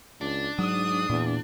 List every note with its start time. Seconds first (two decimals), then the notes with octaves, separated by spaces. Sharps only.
0.21 C#2 D4
0.59 G#2 F#3 D#6
1.10 E2 A#2